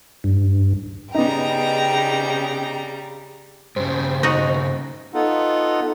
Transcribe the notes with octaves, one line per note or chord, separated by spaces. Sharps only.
G2
C#3 G3 B3 D#4 G5 A#5
G2 C#3 C5
D#4 F#4
B3 D#4 F4 A4 F#5